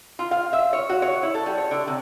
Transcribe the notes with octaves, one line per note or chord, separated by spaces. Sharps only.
F4
F5
E5
C#5
F#4
C#5
E4
A4
G3
C#5
D3
C3